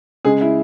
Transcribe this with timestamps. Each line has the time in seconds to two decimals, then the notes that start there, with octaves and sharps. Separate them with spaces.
0.25 C#3 G#3 G#4
0.41 E4